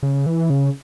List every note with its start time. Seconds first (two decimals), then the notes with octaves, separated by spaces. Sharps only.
0.03 C#3
0.26 E3
0.50 C#3